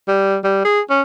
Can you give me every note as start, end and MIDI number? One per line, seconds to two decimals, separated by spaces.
0.08 0.37 55
0.44 0.63 55
0.65 0.80 68
0.90 1.02 61